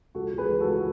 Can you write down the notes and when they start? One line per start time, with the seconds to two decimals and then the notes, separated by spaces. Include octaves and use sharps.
0.15 C#2 F#4 A4
0.32 C#2
0.38 G#4 B4
0.50 E3
0.60 F#4 A4
0.67 C#2
0.75 F#4